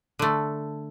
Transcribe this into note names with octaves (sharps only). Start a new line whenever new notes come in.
D3 A3